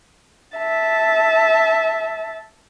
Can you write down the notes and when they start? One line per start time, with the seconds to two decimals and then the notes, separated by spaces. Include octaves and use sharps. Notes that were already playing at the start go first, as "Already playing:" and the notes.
0.57 E5 A5